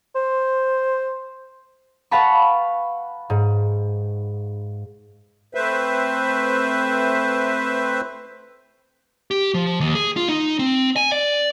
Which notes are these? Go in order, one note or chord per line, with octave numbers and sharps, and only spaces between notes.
C5
B4 F5 F#5 A5 B5 C#6
G#2
A3 C4 B4 C5 E5
G4
F3
D#2
G#4
F4
D#4
C4
G#5
D5